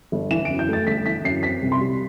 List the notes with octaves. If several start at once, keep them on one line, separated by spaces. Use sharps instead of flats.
G1
E3 E7
D7
F#2
G6
A3 A6
G1 B6
E3 B6
F#2 C7
C4 B6
C2
C6
G3